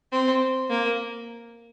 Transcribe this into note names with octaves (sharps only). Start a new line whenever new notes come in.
C4
A#3